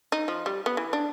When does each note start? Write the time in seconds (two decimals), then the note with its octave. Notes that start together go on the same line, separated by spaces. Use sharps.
0.12 D#4
0.28 F3
0.46 G3
0.66 B3
0.77 E3
0.93 D4